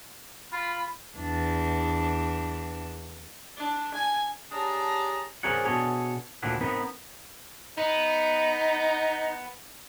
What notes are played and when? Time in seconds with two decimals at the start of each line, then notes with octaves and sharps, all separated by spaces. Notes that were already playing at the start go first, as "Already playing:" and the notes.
0.52 F4 B5
1.16 E2 D4
3.57 D4
3.94 G#5
4.52 D4 G4 G#4 C#5 A5 A#5
5.43 C4 G#4 A#4 C#5 D5 F#5
5.65 B2 D4 G#4 A4 C#5
6.43 D2 A#2 C4 D4 E4 F#5
6.61 B3 C4 D#4 A#4 B4
7.78 B3 D#4